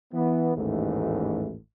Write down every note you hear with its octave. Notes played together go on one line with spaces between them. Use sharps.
E3 B3
A1 D#2 G#2 E3 A3